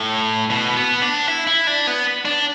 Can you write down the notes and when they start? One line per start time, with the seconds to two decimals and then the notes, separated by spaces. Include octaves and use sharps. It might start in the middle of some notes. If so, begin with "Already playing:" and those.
Already playing: A2
0.50 B2
0.77 B3
1.02 D4
1.28 E4
1.47 E4
1.67 D4
1.87 B3
2.25 D4